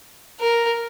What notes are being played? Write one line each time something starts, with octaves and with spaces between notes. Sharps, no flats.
A#4